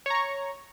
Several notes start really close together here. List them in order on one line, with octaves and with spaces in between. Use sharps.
C#5 A#5 C#6